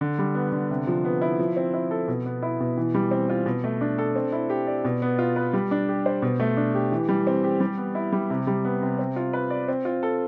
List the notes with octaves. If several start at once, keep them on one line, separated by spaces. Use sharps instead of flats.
D3
G3
B3
D3
C3
F3
B3
E4
F3
C4
E4
A4
B2
B3
E4
B2
E3
G3
C4
F4
B2
A3
D4
A4
C4
E4
G4
D5
B2
B3
F4
B4
G3
D4
G4
C5
B2
A3
D4
G4
E3
G3
C4
G4
G3
B3
E4
G3
C3
G3
B3
C3
C4
F4
B4
D5
C4
F4
A4